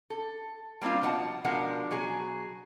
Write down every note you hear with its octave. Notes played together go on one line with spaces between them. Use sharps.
A4
G3 A#3 C4 D4 F4
B2 F3 B3 D5 F#5 A5
B2 F3 G#3 D4 A#4 F#5
B2 F#3 G#4 G#5